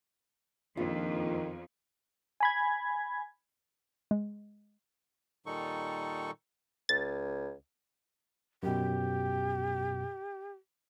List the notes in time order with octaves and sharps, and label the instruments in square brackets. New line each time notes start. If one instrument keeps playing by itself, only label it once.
[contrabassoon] A#1 [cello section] F2 [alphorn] D#3 [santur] F4
[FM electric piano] G#5 B5 G#6
[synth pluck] G#3
[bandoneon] A#2 D#3 G3 D#4 A4 C#6
[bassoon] C#2 [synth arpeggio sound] A6
[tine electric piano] F#2 B2 [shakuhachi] G4